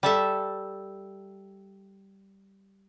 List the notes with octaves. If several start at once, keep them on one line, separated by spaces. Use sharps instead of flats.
G3 A4 E5